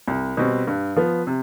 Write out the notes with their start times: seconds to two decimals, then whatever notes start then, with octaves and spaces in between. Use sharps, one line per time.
0.08 C2
0.37 B2 G3 C4
0.67 G2
0.96 F3 B3
1.27 C3